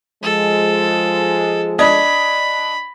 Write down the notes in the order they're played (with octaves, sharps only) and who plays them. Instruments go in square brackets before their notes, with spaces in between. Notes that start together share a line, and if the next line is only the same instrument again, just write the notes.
[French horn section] F3 G#3 [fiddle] A4
[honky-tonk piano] D4 D#5 G#6 [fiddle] B5